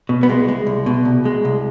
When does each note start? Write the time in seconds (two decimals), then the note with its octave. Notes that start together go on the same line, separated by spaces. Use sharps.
0.09 B2
0.23 B3
0.29 C2 G#3
0.48 G#3
0.67 C2
0.86 B2
1.05 C2
1.25 G#3
1.45 C2